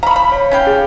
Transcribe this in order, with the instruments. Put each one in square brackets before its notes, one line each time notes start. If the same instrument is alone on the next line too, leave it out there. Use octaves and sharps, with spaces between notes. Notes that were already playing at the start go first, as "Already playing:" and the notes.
[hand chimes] F5 C#6 [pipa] A#5 B5
[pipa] B5
[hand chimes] C#5
[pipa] C#4 F5 G5
[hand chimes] G#4